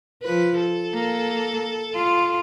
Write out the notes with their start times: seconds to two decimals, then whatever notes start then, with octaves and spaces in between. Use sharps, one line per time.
0.23 F3 B4
0.59 A4
0.94 A#3
1.94 F4